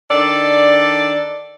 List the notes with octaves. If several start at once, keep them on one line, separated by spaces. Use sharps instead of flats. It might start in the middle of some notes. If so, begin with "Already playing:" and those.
D#3 D4 A4 D5